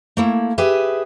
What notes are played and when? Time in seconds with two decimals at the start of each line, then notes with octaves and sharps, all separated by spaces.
0.17 A3 A#3 E4
0.58 G4 G#4 B4 E5